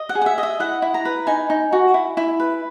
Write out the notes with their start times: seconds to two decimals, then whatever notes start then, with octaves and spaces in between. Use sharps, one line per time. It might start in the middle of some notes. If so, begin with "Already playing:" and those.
Already playing: D#5
0.09 F#5
0.15 G#4
0.22 F#5
0.26 E5
0.38 D#5
0.43 E5
0.60 E4 F#5
0.82 E4
0.94 A#5
1.05 B4
1.27 D#4 G#5
1.50 D#4
1.73 F#4
1.94 E4
2.17 E4
2.40 B4